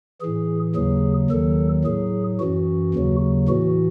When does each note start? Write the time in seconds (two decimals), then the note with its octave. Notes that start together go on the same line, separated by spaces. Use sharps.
0.21 A2 E3 G#4
0.75 D#2 C#3 F#3 G#4
1.31 D#2 D#3 F#3 A4
1.84 A2 F#3 G#4
2.40 F#2 E3 F#4
2.95 D#2 C#3 F#3
3.49 A2 E3 F#4